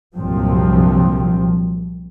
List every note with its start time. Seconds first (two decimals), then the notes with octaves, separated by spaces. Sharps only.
0.16 C2 G2 A#2 F3 F#3 C4